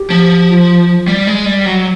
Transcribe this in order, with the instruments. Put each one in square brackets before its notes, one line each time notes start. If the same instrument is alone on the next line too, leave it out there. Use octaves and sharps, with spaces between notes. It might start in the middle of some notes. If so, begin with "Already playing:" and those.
Already playing: [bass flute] G4
[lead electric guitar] F3
[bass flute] F4
[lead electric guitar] G3
G#3
G3
F#3